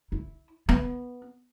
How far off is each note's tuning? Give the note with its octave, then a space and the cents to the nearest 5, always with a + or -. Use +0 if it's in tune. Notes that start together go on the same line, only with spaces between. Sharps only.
E4 -15
B3 -5